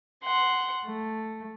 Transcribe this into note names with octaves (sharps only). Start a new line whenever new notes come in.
F#5 C6
A3